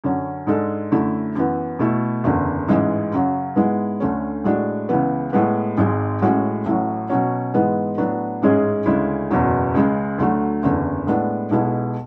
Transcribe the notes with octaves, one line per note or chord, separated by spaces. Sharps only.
F#2 D3 F#3 C#4
G#2 G#3 D4 A4
F#2 D3 A3 E4
F#2 E3 B3
B2 A3 E4 A4
F#1 E2 D3
A1 G#2 E3 G#3
F#2 C#3 F#3
G#2 G#3 B3 E4
D2 D3 A3 C#4
A2 G#3 D4 F#4
C#2 C#3 E3 B3
A2 G#3 B3
G#1 G#2 G#3
A1 A2 G#3 C#4 F#4
A1 A2 F#3
B2 F#3 C#4
G#2 E3 G#3 B3
A2 F#3 B3 D4
A1 G#2 G#3 C#4 G#4
D2 C#3 G#3 C#4 E4
F#1 E2 B2 F#3
C#2 C#3 G#3
D2 D3 F#3 A3
F#1 E2 D3
A2 G#3 B3 D4
B1 B2 G#3 B3 E4